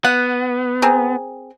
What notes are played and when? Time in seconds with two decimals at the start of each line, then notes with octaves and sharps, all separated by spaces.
0.05 B3 F#5
0.82 C4 G#4 A#4